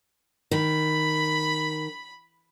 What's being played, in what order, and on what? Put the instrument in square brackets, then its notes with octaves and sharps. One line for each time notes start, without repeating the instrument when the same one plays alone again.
[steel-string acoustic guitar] D#3 [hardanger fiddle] B5